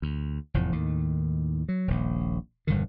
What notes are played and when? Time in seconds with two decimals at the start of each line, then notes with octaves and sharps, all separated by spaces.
0.02 D2
0.54 F1 E2 A2 F3
0.72 D#2 A2 D#3
1.69 F#3
1.88 D#1 A#1
2.67 E1 G2 D3 D#3